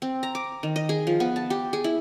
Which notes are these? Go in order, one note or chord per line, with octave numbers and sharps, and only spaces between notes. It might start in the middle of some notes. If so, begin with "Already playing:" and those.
C4
A#5
D6
D#3
D#5
G#4
F3
B3
A5
G4
G#4
E4